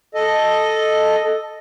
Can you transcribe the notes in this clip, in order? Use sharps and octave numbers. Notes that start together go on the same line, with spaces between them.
A4 D#5